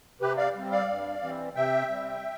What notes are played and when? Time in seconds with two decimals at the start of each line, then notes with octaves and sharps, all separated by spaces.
0.21 C3 G4 B4
0.37 D5 F5
0.55 G3 C4
0.71 D5 F5
0.88 G2
1.22 E3 G3 C4
1.56 C3 E5 G5
1.90 G3 C4